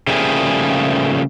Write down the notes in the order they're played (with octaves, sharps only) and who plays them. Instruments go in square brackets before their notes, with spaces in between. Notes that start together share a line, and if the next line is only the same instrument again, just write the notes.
[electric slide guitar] C#3 F3 G3 A3 A#3 G#4